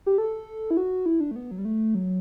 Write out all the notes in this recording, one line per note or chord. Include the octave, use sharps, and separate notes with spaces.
G4
A4
E4
F#4
E4
D4
A3
B3
F#3
G3
A3
F#3